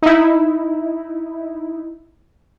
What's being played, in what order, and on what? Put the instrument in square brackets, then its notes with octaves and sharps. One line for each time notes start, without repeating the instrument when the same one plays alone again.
[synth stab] D#4 E4